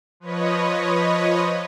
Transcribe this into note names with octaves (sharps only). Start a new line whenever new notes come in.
F3 B4 C#5 D#5